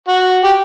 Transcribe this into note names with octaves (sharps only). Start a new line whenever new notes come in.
F#4
G4